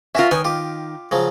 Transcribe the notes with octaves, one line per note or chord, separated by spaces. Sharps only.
C#4 F4 F#4 A#4 E5
D#3 B4 C#5 G#5
F4 G4
C#3 F3 F#3